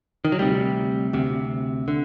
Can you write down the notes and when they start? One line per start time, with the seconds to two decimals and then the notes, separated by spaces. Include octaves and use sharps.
0.25 D#3
0.32 F#3
0.39 D2 C3 G3
1.13 D2 C3
1.88 D3